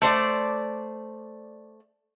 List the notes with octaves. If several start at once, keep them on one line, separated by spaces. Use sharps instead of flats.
A3 C5 D5